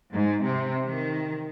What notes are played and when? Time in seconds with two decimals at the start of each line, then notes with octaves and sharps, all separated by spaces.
0.14 G#2
0.44 C3
0.86 D#3